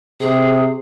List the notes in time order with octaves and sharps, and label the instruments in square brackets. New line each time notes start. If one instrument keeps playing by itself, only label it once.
[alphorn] C3 [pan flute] G#4